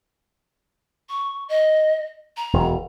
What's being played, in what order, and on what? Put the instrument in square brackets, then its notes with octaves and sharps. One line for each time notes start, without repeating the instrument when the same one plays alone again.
[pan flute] C#6
D#5
A#5
[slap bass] E1